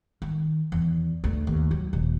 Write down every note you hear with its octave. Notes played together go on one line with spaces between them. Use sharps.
D#3
E2
D2
D#2
F#3
D#1